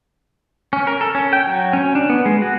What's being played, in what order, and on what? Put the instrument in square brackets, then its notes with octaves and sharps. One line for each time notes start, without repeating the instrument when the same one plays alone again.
[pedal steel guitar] C#4
A#4
A4
C#4
G5
F#3
C#4
D4
B3
G#3
F#4